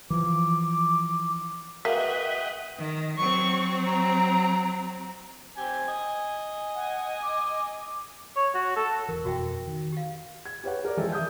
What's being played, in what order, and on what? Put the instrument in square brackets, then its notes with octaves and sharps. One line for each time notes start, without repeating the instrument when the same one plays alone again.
[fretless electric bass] E3 F3 [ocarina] D6
[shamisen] G#3 A#3 [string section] F#4 B4 [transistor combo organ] D#5 F#5 G5 [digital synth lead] E5
[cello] D#3
[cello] F#3 C4 [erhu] C#6
[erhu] A#5
[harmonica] C4 G#5 [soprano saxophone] G4
[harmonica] D#5 [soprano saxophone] G#5
[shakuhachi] F#5
D6
[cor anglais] C#5
F#4
A4
[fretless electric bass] E1 C2 E3 [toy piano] A#4
[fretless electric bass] F2 B2 [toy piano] F#4 E5 G5
[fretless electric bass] D#3
[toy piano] G4 F5
[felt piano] G#6
G4 B4 C#5 F#5
A#4 D5
E3 F3 G3 G#3 G4 A4
E5 D#6 G6